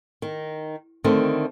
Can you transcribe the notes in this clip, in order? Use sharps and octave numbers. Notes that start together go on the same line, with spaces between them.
D#3
D3 D#3 A3 C4